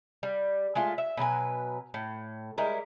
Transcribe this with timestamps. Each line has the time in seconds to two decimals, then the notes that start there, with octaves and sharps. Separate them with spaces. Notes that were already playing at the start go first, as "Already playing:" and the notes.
0.23 G3
0.75 G#3 A3 F4
0.98 E5
1.17 B2 F#3 B4 G#5
1.94 A2
2.58 G3 G#3 E4 A#4